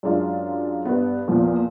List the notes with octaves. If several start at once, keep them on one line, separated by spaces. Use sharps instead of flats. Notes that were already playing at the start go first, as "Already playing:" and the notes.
F#2 G#3 D4 F4
G2 B3
E2 A#2 F3